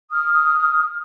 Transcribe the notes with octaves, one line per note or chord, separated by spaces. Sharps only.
D#6 F6